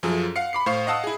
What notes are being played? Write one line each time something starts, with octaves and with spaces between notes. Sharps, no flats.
F#2 F3 G#4 A4
F5 F#5 C7 C#7
B5 D6 C7
A2 C5 F5 C#6 C7
D#5 F5 F#5 A5 D#6 E6
E4 G#4